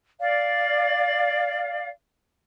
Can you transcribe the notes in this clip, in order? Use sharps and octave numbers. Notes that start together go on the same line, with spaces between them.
D5 F5